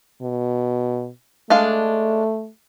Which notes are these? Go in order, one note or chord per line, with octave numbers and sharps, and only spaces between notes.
B2
G#3 A3 D4 F5